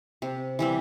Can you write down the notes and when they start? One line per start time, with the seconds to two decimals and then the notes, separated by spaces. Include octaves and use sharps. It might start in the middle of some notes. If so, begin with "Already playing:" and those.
0.22 C3
0.59 E3 G3 C4